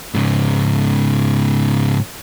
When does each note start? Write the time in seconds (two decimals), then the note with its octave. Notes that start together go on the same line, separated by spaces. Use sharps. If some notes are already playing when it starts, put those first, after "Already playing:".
0.14 G#2 C#3